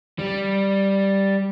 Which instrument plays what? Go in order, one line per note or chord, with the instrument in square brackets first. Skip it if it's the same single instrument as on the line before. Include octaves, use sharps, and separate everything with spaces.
[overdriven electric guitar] G3